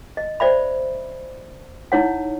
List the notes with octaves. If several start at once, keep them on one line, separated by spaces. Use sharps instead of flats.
D#5
C5 D5 E5 B5
D#4 E4 C#5 F#5